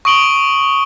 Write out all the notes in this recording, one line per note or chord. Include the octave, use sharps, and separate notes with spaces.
C#6 D#6 D7 F#7 G7